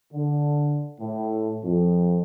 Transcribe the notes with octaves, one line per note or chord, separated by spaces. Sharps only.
D3
A2
F2